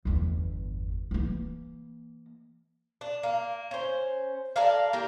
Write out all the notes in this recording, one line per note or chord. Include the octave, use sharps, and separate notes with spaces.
G1 E2
E3 A#3
D4
A#3
C#4 C5
A4 A#4 D5 F5
A#3 G4 A#4